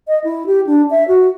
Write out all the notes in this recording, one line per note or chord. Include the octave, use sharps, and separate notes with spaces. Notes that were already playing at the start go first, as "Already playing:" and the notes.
D#5
E4
G4
D4
E5
F#4